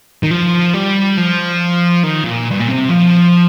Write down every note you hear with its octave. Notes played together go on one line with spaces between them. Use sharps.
D#3
F3
G3
F3
D#3
A#2
G2
A#2
C3
F3